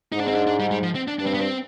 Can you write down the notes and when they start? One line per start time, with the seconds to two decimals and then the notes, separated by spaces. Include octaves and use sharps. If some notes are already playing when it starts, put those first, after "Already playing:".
0.12 G#2 D#4
0.20 D4
0.28 C4
0.35 D4
0.47 D4
0.60 G3
0.71 G3
0.83 F3
0.95 C4
1.08 D4
1.19 G2 D4
1.26 C4
1.34 B3
1.41 C4